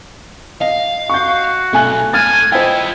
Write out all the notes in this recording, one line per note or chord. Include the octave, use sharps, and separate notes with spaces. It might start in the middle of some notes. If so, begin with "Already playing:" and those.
D#5 F5
F#4 C#6 G6
B1 A3 G#5 F#6
A2 G#5 F6 A6
E4 F4 C5 D#5 G5